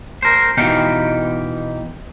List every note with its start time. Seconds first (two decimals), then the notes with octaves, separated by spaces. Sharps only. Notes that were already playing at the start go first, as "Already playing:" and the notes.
0.22 A#4 C5
0.57 B2 E3 D#4 G4 F5 G5